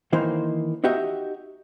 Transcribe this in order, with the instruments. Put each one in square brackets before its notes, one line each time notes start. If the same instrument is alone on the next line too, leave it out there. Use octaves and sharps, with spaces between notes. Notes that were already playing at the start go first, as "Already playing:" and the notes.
[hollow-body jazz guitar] D#3 E3 A#3 D#4 C5
D#4 F#4 G4 D#5 E5